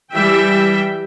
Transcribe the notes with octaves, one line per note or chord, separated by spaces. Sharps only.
E3 G3 E5 G5